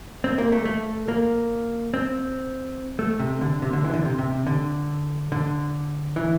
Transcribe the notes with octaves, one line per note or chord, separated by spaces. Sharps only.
C4
A#3
A3
A3
A#3
C4
A3
C3
D3
C3
D3
E3
C3
D3
C3
C3
D3
D3
E3